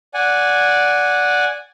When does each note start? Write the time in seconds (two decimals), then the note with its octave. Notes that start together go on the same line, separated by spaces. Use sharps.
0.14 D5 F#5 G#5